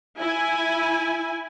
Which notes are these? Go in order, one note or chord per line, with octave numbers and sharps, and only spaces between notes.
E4 G#5